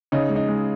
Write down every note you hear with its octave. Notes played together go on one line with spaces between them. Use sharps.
C#3 D#4
G#3
D#4
G#3